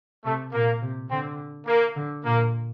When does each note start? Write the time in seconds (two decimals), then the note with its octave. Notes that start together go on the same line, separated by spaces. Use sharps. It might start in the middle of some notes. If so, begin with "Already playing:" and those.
0.25 C3 A3
0.53 A#2 A#3
0.82 C3
1.10 D3 C4
1.67 A#3
1.96 D3
2.24 A#2 A#3